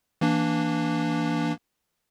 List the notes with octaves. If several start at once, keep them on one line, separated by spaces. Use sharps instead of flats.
E3 A#3 D4